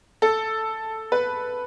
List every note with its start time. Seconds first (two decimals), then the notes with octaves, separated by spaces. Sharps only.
0.22 A4
1.12 B4